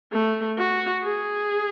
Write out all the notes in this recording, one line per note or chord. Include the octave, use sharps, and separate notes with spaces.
A3
F#4
G#4